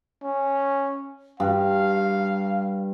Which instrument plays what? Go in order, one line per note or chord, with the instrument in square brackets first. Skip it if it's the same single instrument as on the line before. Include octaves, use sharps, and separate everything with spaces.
[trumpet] C#4
[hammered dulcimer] G2 [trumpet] F5